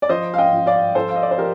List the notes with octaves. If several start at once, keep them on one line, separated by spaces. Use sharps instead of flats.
D5
F3 C5 D#5
F5
D#5 G5
F3
D5 F5
F3 A4 C5
F5
D#5
D5
C5
F3 G4 A#4